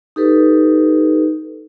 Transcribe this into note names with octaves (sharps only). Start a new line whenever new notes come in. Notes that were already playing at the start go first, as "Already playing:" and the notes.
D#4 G4 A4 B4